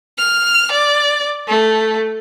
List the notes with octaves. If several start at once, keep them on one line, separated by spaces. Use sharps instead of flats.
F6
D5
A3